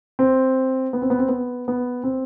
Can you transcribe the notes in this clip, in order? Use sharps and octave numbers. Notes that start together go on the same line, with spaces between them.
C4
B3
C4
B3
C4
B3
B3
C4